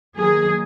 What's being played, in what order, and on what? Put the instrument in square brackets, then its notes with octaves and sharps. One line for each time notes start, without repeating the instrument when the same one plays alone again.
[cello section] D#3 F#3 A#3 G#4